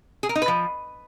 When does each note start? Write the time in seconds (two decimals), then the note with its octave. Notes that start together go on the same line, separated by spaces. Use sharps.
0.23 G#4
0.29 A#4
0.35 D#4
0.42 B4
0.48 F3